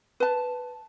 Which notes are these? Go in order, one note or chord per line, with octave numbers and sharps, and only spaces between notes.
B4 A5